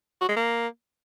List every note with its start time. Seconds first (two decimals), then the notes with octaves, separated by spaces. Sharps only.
0.21 F#4
0.29 G#3
0.36 A#3